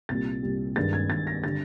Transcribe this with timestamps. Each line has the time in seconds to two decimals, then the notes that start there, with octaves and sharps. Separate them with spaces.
0.09 C2 A#2 G3 A6
0.43 C2 A#2 G3
0.76 G2 D#3 G#3 A6
0.93 G#6
1.10 G2 D#3 G#3 A6
1.27 A#6
1.44 D3 G3 A6